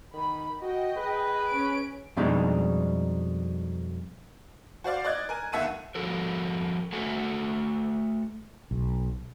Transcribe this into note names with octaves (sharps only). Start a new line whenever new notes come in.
D#3 B5
F#4 D#5 G5
G#4 B4
C#4 D7
F2 B2 G3 G#3 D4 D#4
F#4 C5 D5 F5
D5 D#5 F#6 G#6
A#4 G#5 D#7
G1 D#2 E5 F#5 A5 D#7
F3 F#4 A4 A#4
A3 F#4 A4 E5 F#5 G#5
B1